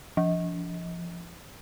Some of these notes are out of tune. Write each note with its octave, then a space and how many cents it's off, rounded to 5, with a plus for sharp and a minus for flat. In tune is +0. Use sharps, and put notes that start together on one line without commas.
F3 -20